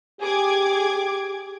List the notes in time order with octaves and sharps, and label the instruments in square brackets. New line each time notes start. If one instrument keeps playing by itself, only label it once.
[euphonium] G4 [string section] G#4 D6 G#6